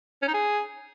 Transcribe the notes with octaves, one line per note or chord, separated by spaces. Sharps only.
C#4
D#4
G#4